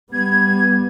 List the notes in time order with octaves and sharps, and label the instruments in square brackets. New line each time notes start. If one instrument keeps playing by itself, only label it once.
[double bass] G3 B3 [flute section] G#6